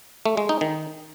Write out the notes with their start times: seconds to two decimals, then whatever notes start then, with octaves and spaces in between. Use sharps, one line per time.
0.26 A3
0.37 G#3
0.49 D#4
0.61 D#3